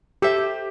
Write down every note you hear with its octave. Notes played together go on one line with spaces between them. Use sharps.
G4 A4 C5 E5